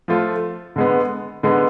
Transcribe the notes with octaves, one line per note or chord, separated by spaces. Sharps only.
F3 A3 F4
D3 G#3 B3
D3 G#3 B3